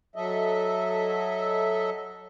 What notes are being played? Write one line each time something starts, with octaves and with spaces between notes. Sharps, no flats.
F#3 A4 D#5 E5